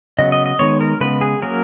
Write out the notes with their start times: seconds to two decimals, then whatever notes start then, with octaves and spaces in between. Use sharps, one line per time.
0.18 C#3 F#3 B3 D#5
0.32 D#5
0.46 D#5
0.59 D#3 G#3 B3 C#5
0.81 A#4
1.00 C#3 G#3 B3 B4
1.21 G#4
1.42 F#3 A#3 C#4 A#4